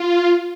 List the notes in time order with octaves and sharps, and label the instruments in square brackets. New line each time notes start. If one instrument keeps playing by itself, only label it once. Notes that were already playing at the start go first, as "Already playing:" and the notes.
Already playing: [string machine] F4